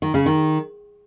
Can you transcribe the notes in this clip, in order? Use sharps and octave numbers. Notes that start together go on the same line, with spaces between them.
D#3
C#3
D#3